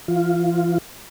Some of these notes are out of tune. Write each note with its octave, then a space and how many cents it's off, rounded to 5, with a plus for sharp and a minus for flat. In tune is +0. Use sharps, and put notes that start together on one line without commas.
E3 +45 F4 +0